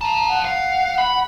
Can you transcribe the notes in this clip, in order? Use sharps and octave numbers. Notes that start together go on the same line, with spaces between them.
F5 A5 A#5
F#5
F5
B5